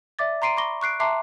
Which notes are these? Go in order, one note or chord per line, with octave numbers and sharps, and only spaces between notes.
D5 E5 D6 A6
A#5 C6 C7 D7 D#7
B5 C#6 D6 A#6 G7
C#6 F#6 C7 D7
E5 A5 A#5 C6 D6 C7